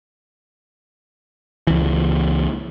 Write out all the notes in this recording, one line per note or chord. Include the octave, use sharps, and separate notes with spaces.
C#2 E3